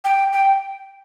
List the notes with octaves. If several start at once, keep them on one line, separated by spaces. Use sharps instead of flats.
G5
G5